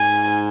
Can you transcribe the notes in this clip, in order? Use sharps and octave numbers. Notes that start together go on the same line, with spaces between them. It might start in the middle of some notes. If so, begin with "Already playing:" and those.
Already playing: G#2 G#5